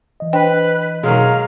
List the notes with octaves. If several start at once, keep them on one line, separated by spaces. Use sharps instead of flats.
E3 D#5
D4 B4 C5 G5
B2 D#3 F#3 G#3 F5